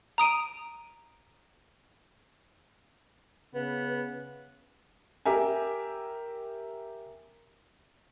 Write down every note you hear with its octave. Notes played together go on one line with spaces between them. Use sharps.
A#5 D#6 D7 D#7
C#3 B3 B4
G4 A#4 E5 G#5